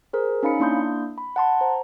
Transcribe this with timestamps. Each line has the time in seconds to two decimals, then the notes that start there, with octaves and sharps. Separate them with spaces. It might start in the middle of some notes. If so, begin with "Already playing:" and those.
0.13 G#4 A#4 C5
0.43 C#4 D#4 F5 B5 C#7
0.60 A#3 D4 E4 C6 D#6 G6
1.18 B5
1.36 F#5 A5 C6
1.61 C5 A#5